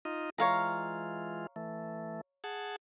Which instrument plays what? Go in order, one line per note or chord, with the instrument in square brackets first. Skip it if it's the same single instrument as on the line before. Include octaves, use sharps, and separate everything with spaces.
[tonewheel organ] D#4 F4 D#5
[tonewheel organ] E3 G#3 F4 [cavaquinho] C#5 F5 A#5
[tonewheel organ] E3 A3
G#4 F#5 A5